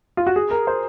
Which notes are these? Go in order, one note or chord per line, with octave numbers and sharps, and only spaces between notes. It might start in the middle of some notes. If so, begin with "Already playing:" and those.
F4
F#4
G#4
A#4
C5